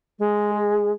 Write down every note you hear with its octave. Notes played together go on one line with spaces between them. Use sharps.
G#3
G#4